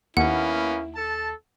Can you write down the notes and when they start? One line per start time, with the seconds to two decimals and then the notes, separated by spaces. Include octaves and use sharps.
0.17 D#2 A#3 B3 C#4 E4 F#5
0.95 A4 A5